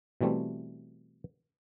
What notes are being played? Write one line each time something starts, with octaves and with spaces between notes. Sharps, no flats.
B2 E3 G3 A3 C4